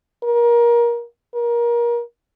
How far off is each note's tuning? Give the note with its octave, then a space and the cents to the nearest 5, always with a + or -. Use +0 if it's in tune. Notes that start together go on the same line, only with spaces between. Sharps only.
A#4 +25
A#4 +25